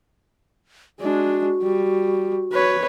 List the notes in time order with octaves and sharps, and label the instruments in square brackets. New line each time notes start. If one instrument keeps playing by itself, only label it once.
[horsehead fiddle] G#3 D4 [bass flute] F#4
[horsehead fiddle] G3
B4 C#5